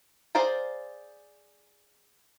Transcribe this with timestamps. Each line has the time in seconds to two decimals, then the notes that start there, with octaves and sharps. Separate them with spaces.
0.35 G#4 C5 D5 F5 A#5